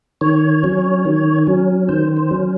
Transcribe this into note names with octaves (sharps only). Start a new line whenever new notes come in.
D#3 C#5
F#3 C#4
D#3
F#3 C#4
D#3 C5
C5
F#3 C#4